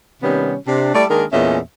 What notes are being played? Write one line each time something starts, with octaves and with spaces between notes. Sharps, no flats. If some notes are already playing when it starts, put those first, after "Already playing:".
C3 D#3 G3 B3 C#4
C3 D4
G3 A3 E4 A4 D5
D#3 G#3 A#3 D4 A#4
E2 A#2 A3 C#4 D#5 E5